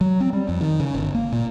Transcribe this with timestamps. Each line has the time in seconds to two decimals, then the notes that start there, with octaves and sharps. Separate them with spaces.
0.01 F#3
0.20 C4
0.33 G3
0.49 F2
0.61 D#3
0.80 C#3
0.95 G1
1.15 A#3
1.32 A#2